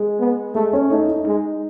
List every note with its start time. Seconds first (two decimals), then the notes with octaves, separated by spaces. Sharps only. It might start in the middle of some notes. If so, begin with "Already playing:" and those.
Already playing: G#3
0.19 B3
0.55 G#3 A3
0.73 C#4
0.91 A3 D#4
1.09 D#4
1.26 G#3